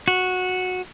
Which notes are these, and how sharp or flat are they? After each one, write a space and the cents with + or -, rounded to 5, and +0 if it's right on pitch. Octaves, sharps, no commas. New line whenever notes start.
F#4 -10